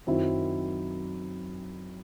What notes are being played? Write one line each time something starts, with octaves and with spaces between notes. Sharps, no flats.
F#2 D#3 F#3 C4 E4